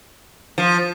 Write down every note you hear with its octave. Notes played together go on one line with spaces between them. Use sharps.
F3